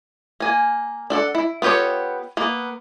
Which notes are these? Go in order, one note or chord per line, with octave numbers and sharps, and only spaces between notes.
A#3 G#5
D4 A4 F#5
E4
B3 F4 G4 A4 C#5
A#3 B3